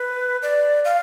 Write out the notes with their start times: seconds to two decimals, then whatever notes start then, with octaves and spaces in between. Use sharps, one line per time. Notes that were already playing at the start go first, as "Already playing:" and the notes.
Already playing: B4
0.42 D5
0.85 F5